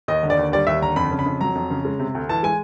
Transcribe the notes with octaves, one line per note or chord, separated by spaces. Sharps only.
D#2 D#5
D3
D5
D#2
G3 D5
D#2 E5
D3 A#5
F2 B5
C#3
B5
F2
F#3 A#5
F2
C#3
G#3
C3
D2
E3 A5
G#3 G#5